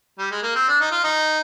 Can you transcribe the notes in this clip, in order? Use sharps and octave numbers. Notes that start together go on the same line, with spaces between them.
G3
G#3
A#3
C4
D4
D#4
F4
D#4